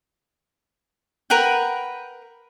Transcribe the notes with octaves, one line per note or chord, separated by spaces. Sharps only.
A#4 B4 F#5 G5